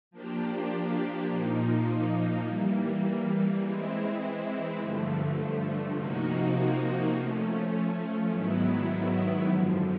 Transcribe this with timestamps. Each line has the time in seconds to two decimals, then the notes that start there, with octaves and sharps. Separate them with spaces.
0.11 F3 A#3 D4 G4
1.28 A#2 F3 A#3 D#4
2.45 E3 G3 A#3
3.61 E3 G#3 C4 E4
4.78 G2 D3 F3 A3
5.95 C3 F3 A#3 D#4 F#4
7.12 F3 A3 C#4
8.30 G#2 D#3 F#3 B3 E4
9.46 F#2 D3 F3